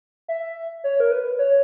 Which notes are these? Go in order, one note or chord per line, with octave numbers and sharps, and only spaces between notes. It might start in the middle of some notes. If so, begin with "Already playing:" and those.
E5
C#5
A#4
B4
C#5